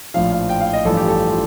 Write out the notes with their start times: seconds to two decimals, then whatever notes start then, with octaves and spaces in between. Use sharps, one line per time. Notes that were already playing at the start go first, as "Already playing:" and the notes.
0.14 A#1 A2 F3 F5
0.32 F5
0.49 G5
0.61 F5
0.73 D#5
0.85 A1 G2 F3 A4
0.97 G4
1.08 A4
1.30 F4